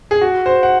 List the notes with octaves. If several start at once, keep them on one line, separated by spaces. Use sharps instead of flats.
G#4
F#4
C5
F#5